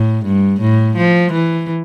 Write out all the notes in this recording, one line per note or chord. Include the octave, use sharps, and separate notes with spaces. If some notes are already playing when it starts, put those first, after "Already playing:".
Already playing: A2
G2
A2
F3
E3